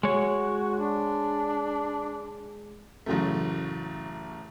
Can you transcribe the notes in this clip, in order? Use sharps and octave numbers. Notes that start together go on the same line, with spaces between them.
G#3 F#4 C#5
D4
A1 F#2 C#3 F#3 A3